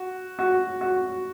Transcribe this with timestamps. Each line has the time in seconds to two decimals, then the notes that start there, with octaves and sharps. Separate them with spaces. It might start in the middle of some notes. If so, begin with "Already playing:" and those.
Already playing: F#4
0.39 F#4
0.81 F#4